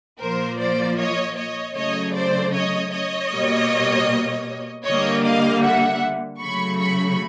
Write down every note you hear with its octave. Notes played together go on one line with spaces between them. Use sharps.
A#2 F3 A#3 A#4 C5
C5 D5
C#5 D#5
C#5 D#5
C#3 F#3 A3 C#5 D#5
C5 D5
C#5 D#5
C#5 D#5
B2 G3 A#3
D3 G3 A#3 C#5 D#5
D#5 F5
E5 F#5
C#3 F#3 A3 B5 C#6
B5 C#6